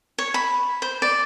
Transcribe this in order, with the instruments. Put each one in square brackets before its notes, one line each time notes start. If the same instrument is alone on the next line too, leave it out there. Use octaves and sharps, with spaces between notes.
[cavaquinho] C#5
B5
C5
D5